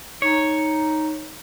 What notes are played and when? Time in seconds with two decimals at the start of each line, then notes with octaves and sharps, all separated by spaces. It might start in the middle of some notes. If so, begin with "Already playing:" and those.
0.22 D#4 C#5